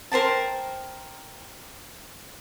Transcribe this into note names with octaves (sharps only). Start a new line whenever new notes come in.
A#4 C5 G5 A5